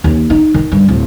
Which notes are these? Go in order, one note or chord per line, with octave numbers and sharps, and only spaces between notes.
D#2
D#4
D#3
G2
D1